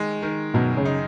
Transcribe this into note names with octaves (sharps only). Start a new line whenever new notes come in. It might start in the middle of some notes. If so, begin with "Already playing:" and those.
Already playing: D#3 G#3
D#3
F#2 B2
C#3
D#4